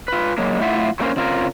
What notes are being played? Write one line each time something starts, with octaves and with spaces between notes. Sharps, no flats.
F4 B4
F#3 G#3 A#3
A3 E4 F4 E5 F#5
F#3 A3 A#3 C#4 A#4 C5
C#3 C4 F4 A#4